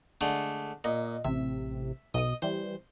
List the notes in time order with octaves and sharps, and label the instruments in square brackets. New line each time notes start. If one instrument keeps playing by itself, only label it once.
[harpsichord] D3 G#3 A3
[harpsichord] A#2 [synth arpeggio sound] D#5
[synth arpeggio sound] A1 C3 [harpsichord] E5
[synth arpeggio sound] B1 D#6 [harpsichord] D#5
[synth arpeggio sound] E3 G3 [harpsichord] C5